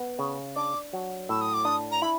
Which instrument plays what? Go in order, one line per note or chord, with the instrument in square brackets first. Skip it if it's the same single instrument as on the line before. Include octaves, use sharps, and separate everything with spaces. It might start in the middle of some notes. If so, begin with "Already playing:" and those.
Already playing: [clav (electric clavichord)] B3
C#3
[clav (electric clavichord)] D4 [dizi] D6
[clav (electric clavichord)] F#3
[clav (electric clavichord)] A2 [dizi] E6
[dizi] D#6
D6
[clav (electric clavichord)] D4 [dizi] D#6
[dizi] A#5
[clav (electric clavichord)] E4 [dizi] B5